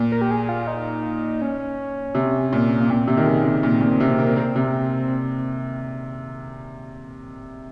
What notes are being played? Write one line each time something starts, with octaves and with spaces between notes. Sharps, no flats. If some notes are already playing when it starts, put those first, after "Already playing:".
Already playing: A#2
A#4
G4
G#4
F4
D#4
C#4
C3
A#2
A#3
A#2 C4
C3
D#3
C#3
C3
A#2
A#2
C3
A#3
A#3 C4
C3